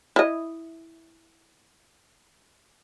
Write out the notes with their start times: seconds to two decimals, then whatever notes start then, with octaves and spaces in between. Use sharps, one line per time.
0.16 E4 D#5